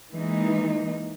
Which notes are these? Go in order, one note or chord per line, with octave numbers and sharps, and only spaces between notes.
E3 G#3 A#3 D#4